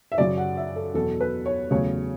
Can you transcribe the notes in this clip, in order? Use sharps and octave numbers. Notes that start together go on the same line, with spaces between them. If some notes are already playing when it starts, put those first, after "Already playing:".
E5
F#2 C#3 F#3 D5
F#5
E5
A4
E2 B2 F#3 A4
B4
C#5
E2 C#3 F#3 A3 C#5